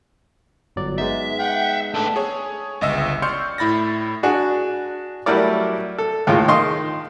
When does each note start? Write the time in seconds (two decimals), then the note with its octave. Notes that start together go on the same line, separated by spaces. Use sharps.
0.76 G1 F#3 D5
0.98 G#3 B3 D#4 E5
1.39 F#5 G5
1.94 A3 D4 A4 B4
2.16 G#4 C#5
2.81 G1 C#2 D#5 E5 E6
3.22 D5 C6 C#6 F6 G6 C#7
3.58 A2 E4 B5 A6 A#6
4.23 D4 F#4 G#4
5.26 F#3 G3 A3 E4 A#4 D5
5.98 A4
6.27 D#2 A2 G#3 F4
6.48 D#3 D#5 F5 C6 C#6